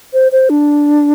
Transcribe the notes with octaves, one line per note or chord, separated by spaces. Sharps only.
C5
C5
D4